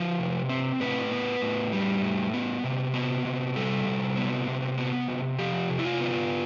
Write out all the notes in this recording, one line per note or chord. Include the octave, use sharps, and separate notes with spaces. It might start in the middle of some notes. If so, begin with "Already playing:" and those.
Already playing: F3 B4
C3
C4
A2 B4
B3
A2
G3
A2
B3
C3
B3
C3
G3 A4
C3
B3
C3
B3
C3
F3 G4
C3
E4
F4
B3